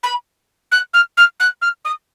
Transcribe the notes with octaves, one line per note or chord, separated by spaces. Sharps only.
B5
F#6
F6
F6
F#6
F6
D#6